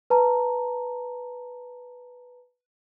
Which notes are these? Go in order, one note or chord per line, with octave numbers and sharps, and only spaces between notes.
B4 A5 A#5